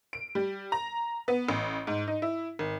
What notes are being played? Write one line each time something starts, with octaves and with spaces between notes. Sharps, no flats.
D7
G3
A#5
B3
A1
G#2
D#4
E4
G#1